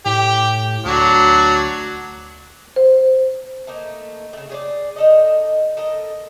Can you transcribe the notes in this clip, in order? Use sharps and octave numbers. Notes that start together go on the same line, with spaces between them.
A2 G4
D2 F#3 D4
C5
A3 A#3 D#4
C#3 A3
G#4 C#5 D5
D#4 A4 D#5
A4 A#4 D#5